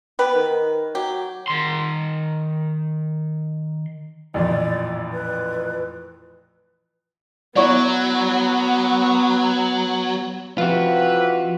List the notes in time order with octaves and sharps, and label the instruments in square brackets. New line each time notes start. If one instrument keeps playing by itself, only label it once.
[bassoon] B3 [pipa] G4 B4
[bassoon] D#3
[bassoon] F#3 [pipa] G4
[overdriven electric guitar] D#3 C6
[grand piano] A1 F2 A#2 [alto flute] D5
[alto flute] B4
[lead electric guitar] F#3 [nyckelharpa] B3 [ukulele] E4 C#5 D5
[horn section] C3 E3 B4 [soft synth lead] F3 [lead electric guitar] F4 F#4